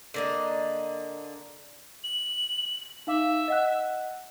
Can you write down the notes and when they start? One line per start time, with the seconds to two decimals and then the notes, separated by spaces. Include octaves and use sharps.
0.14 D3 A#3 D#5
2.04 F#7
3.07 D#4 E5 F5 D6
3.48 D#5 F#5 F#6